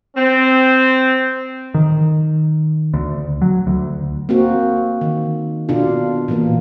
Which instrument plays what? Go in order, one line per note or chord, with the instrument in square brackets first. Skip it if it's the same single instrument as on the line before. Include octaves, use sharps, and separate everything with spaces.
[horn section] C4
[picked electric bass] D#3
D2
F#3
D2
[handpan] A#3 C4 F#4
D#3
B2 D4 F4
A#2 E3 A#3